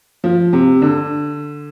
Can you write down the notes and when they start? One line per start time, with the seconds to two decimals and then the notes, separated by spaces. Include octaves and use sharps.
0.24 F3
0.53 C3
0.82 D3